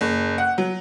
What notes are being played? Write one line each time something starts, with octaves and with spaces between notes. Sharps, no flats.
F#1
F#5
F#3